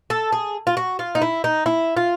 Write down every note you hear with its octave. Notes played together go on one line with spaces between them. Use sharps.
A4
G#4
F4
F#4
F4
D#4
E4
D#4
E4
F4